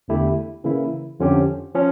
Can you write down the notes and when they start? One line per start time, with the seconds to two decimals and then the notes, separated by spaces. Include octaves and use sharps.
0.08 E2 D3 A3 E4 G4
0.64 C#3 E3 A#3 E4
1.20 F2 D3 F3 C#4 G4
1.74 F3 C#4